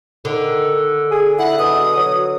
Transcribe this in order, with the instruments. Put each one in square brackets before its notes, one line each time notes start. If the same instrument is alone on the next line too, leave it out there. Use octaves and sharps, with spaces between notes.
[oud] D3 [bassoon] D#3
[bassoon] G#4
[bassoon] E4 [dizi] F#5
[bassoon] B2 [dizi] D#6
[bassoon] F#3